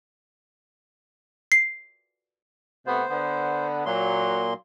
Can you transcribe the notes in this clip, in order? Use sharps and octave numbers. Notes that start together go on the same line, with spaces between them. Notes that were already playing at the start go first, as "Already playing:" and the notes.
C7
C3 A3 B3 C5
D3 B3
A#2 F#3 A#3 C6